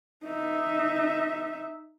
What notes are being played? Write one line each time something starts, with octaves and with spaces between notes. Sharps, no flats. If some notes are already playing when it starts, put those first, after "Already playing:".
D#4 E5